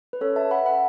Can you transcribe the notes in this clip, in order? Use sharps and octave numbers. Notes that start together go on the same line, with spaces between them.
B4
C#4 A4 C#5
E5 A5
A4 F#5 B5
F#5 B5